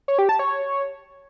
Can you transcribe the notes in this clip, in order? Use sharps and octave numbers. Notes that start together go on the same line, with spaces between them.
C#5
G4
A5
C#5